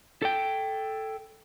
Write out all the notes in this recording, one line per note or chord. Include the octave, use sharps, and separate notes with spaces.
A4 G5